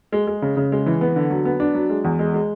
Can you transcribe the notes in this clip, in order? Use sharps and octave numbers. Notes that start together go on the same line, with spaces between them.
G#3
G#3
C#3
C#3
G#3
E3
B3
D3
F#3
B3
D4
F#3
G#3
E2
G#3
G#3